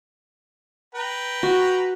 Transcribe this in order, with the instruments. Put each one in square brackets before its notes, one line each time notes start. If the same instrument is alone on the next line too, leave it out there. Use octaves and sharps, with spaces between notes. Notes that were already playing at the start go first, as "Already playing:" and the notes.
[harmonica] B4 G5 A#5
[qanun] F#4